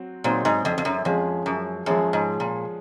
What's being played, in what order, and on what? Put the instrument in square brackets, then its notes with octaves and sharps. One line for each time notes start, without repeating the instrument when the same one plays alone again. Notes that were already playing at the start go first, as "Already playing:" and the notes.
Already playing: [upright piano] F#3 C4 F#4
[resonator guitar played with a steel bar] A#2 [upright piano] F#3 C4 D#4 F#4 C5
[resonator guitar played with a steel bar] G#2
F2
F2
F#2
[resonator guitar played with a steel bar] F2 [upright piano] F3 G#3 C#4 G#4
[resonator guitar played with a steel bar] F#2
[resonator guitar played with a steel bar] F#2 [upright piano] F3 G#3 C#4 G#4
[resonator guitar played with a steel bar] G#2
A#2